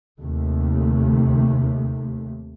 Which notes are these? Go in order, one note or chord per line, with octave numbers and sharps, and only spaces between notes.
D#2 C3 A3